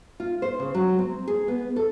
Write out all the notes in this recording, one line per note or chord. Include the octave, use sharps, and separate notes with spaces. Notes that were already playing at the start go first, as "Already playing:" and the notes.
F4
C5
C#3
F#3
C4
G#4
B3
A4